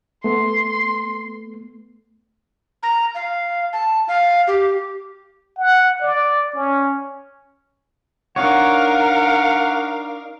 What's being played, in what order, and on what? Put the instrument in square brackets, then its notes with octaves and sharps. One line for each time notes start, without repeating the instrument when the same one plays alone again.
[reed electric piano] A3 B3 [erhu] C6
[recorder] A#5
F5
A5
F5
G4
[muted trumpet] F#5
D5
C#4
[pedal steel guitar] D4 D#4 C#5 [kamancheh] A#4 F5 [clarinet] F#5